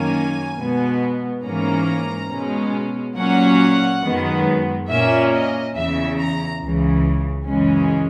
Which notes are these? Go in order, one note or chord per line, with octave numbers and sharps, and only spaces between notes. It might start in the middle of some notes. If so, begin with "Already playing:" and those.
Already playing: F#2 D#3 A#3 C#4 G#5
B2 G#3 B3
G#2 E3 A#3 C#4 A#5
B2 G#3 C#4
A#2 F#3 A#3 C#4 F#5
F#2 D#3 G#3 B3
A#2 A#3 C#4 E5
D#5
E2 C#3 E3 E5
A#5
C#2 C#3 E3
F#2 C#3 E3 G#3 C#4